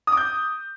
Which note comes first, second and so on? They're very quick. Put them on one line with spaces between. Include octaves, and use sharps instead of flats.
D#6 D6 G6